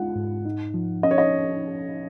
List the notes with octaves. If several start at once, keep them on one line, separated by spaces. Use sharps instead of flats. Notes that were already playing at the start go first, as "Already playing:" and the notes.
Already playing: G#3 F4 F#5
G#2
D#4
F3
C#4 D#5
C#5
D#5